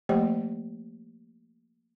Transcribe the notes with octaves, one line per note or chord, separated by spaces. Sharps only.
F3 A3 A#3 G4 C5 D#5